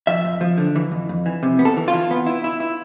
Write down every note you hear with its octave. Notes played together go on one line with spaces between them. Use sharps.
F3 E5
F2
F3
D3
E3
F2
F2
E3
C3
B3
A4
E3
F4
E3
B3
E4
E4
E4